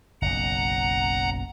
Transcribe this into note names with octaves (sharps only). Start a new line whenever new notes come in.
F#1 B1 F#5 A#5